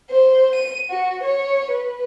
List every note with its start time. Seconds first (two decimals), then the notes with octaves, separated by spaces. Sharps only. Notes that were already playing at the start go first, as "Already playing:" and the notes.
0.10 C5
0.55 D#7
0.90 F#4
1.23 C#5
1.70 B4